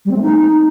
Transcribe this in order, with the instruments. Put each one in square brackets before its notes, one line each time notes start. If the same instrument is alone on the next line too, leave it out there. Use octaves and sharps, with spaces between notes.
[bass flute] G3
C4
A3
D#4